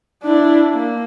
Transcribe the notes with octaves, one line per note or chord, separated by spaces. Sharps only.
D4 E4
A#3